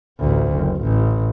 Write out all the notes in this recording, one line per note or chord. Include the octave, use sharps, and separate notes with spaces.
A1 D2
F#1
A1